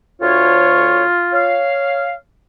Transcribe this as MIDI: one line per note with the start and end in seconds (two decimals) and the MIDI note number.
0.21 1.04 38
0.21 1.62 65
0.21 1.04 73
1.32 2.15 73
1.32 2.15 77